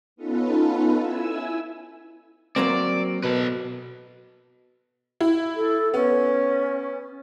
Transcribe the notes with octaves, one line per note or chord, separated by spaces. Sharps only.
B3 C#4 D#4 F4 A4 B4
E4 G#5 E6
F#3 A#3 C4 D5
B2 A4 B4
E4
A4
B3 C#4